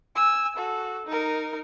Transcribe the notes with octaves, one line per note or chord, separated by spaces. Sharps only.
G#5 E6
F#4 A4
D#4 A#4